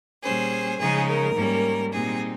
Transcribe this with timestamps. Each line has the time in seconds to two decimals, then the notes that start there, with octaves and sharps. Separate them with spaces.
0.23 A#2 G3 C#4 G#4 C5
0.79 C#3 F3 G#3 D#4 G#4
1.08 A#4
1.36 G#2 G3 A#3 C#4
1.92 A#2 G3 C4 D#4 G#4